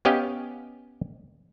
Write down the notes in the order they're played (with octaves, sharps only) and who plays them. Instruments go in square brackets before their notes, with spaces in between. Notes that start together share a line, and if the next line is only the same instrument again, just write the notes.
[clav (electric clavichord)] B3 C#4 G4 D#5 F5 G5